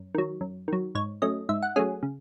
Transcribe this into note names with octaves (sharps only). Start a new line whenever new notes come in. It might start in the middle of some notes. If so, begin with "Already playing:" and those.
Already playing: F#2
D#3 F#3
F#2
D#3 F#3
G#2 C#5
F#3 A3 C#4 D#5
G#2 E5
F#5
F#3 A3 C#4 G#4
C#3